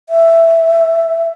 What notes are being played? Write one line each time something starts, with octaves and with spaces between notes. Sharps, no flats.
E5